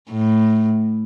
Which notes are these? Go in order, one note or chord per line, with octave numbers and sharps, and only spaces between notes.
A2